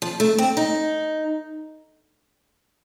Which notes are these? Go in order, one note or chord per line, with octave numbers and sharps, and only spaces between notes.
F3
A3
C4
D#4